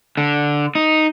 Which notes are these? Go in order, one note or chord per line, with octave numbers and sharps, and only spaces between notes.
D3
D#4